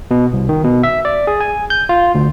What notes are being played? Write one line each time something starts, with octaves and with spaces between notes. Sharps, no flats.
B2
C2
D#3
B2
E5
D5
G#4
G#5
G6
F4
D2